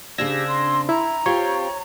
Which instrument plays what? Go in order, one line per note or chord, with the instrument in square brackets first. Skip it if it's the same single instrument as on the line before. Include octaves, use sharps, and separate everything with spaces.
[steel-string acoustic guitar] C#3 C4 D4 [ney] G4 [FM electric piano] E6 G#6 A#6
[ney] C6
[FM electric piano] E4 [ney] A#5
[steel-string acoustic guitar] C4 F4 G4 [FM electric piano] C#5